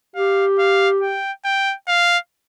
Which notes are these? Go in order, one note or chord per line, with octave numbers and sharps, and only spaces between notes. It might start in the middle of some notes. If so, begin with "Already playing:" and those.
G4 F5
F5
G5
G5
F5